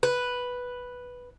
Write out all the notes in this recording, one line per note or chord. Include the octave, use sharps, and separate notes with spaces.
B4